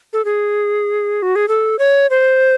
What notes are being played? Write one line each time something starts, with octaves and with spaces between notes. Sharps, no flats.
A4
G#4
F#4
G#4
A4
C#5
C5